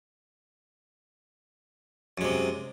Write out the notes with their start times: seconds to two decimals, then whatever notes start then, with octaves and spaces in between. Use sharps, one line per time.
2.18 F#2
2.21 G#3
2.25 C3